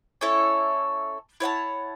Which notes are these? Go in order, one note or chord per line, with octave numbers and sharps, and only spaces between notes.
C#4 E4 A4 C#5
E4 C#5 F#5 A5